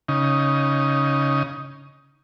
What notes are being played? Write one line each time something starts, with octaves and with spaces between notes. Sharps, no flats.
C#3 D#4